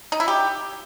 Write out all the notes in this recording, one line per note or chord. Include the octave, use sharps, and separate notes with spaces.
D#4
E4
G4